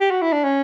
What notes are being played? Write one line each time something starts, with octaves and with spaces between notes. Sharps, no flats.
G4
F#4
E4
D4
C#4